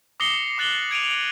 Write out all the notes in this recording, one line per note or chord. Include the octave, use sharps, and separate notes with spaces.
D6 D#6 A#6 C7 C#7 G7
D6 F#6 A6 F#7 G7
G#6 D7 D#7 F7